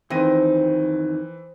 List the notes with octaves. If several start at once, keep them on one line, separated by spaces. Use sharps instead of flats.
F2 D#3 E3 C4 A#6 D#7